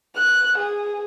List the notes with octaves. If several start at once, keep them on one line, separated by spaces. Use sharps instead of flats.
F#6
G#4